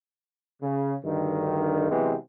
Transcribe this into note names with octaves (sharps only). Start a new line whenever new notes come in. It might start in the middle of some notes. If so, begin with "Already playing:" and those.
C#3
D2 G2 D3 D#3
C3 E3 F#3 G#3 B3 C4